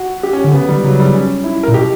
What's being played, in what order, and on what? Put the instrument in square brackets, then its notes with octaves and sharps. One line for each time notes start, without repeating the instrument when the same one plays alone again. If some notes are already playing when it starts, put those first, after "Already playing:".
Already playing: [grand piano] F#4
G4
C#4
[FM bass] D3 [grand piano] C#4
[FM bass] C#3 [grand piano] B3
[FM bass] D3 [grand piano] G3
[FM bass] C#3 [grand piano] F#3
[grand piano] G3
C#4
E4
[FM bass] A#2 [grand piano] A#4
[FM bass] B2 [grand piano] G4